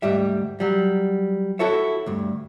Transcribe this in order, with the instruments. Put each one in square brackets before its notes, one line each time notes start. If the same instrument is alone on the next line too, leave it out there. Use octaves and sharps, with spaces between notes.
[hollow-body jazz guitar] D2 G#2 G3 E5
F#3 G3
E4 F#4 A4 C#5 E5
D2 G2